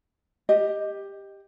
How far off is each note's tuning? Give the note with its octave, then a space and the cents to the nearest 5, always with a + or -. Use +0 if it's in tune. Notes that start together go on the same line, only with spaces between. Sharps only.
G4 +10 D#5 +0